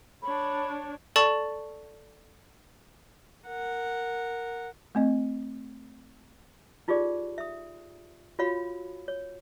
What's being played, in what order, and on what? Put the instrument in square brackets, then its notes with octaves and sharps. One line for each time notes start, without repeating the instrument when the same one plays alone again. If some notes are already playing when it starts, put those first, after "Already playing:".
[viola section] D4 C#5 [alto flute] B5
[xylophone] A4 D5 A5 C#6 A6
[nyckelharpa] A#4 F#5
[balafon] A3 C4 D#5
[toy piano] D#4 F4 G4 G#4 D5
E5 D#6
F4 F#4 C#5 F5 B5
C#5